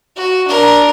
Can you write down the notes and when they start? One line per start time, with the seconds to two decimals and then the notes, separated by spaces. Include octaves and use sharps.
0.16 F#4
0.48 D4 A#4